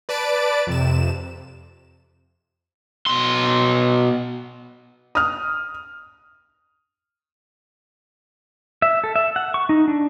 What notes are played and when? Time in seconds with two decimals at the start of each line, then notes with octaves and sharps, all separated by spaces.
0.09 B4 D5 A5 A6 D7
0.67 F2 C3 E7
3.06 B2 C6
5.15 D#6 F6
8.82 E5
9.04 A4
9.16 E5
9.36 F#5
9.54 C#6
9.69 D#4
9.88 D4